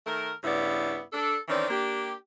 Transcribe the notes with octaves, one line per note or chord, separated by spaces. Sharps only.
D#3 A3 A#4
G2 C#3 B3 E4 D5
D4 A4
D#3 E3 C4 C#4 D5
A#3 D4 G4